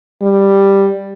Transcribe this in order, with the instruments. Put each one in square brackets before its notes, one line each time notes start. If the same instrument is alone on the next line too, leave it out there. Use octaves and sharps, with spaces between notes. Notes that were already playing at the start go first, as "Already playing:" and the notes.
[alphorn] G3